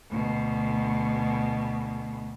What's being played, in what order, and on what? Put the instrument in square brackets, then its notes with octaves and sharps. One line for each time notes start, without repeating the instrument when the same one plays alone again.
[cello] D2 B2